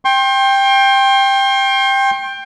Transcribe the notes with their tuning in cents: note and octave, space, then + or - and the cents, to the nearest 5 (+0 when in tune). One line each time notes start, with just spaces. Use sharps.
G5 +10 C6 +35